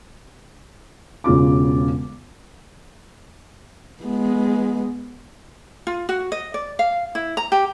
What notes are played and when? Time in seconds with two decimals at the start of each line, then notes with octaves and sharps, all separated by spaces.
1.24 E1 C#3 F4 D6
4.03 G#3 B3
5.87 F4
6.09 F#4
6.32 D#5
6.54 D5
6.79 F5
7.15 E4
7.37 A#5
7.52 G4